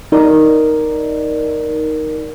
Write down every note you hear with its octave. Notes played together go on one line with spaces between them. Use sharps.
D#4 A#4 D5